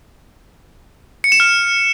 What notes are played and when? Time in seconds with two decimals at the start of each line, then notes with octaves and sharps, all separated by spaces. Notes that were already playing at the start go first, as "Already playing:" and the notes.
1.24 C#7
1.32 E7
1.40 F6